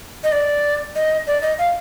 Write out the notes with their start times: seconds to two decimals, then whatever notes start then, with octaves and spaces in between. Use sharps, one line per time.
0.24 D#5
0.32 D5
0.95 D#5
1.27 D5
1.42 D#5
1.58 F5